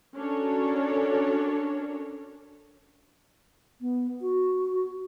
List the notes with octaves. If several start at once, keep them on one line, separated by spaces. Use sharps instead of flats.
C#4 D4 F#4 A4 A#4 C#5
B3
F#4